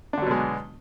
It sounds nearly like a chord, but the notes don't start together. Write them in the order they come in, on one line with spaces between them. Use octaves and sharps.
D4 D3 F#3 B2 G#3